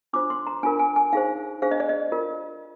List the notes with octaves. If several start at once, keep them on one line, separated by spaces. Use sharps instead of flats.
D4 F4 C5 D6
C6
A#5
D4 F4 A#4 G#5
G#5
G#5
D#4 G#4 C5 F5
D4 G#4 C5 F5
D#5
D5
D#5
F4 A#4